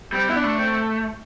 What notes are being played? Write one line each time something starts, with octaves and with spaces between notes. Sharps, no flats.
G3 C4
B3 E4
D4
A3
C4